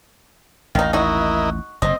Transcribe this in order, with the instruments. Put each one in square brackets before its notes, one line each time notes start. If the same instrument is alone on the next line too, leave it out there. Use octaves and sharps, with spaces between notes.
[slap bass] A1 D#2 [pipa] D#3 D#4 [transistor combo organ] F5
[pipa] D#4 F#4 [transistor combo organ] E4 A#4 D#5
[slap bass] F#1 C3 [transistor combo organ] C4 [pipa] D#5